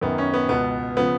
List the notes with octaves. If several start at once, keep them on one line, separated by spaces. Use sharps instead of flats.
F#2 D#3 B3
C#4
B3
C#2 B2 B3
C#3 F3 B3